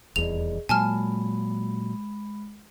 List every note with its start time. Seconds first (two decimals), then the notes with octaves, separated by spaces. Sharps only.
0.16 D#1 E2 G#4 D5 D#5 F7
0.69 A#2 F#3 G#3 G#5 A5 B5 F6